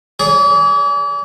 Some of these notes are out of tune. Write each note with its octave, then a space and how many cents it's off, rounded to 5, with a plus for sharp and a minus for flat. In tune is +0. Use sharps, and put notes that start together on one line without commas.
G#4 +0 D5 -40